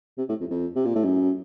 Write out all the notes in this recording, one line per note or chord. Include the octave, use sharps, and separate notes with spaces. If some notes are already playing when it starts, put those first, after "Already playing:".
C3
A2
F2
F2
C3
A#2
A2
F#2